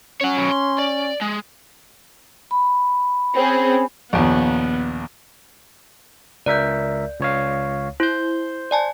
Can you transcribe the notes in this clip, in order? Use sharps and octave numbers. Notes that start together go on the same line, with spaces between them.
C#4 C#5 F#5
F#2 B2
C6
D5
G#3
B5
C4 C#4 G#4
A#1 D#2 B3
C#2 A#4 D5 E5 G6
C#2 C#5 F5
E4 C5 G6
D5 G#5 A5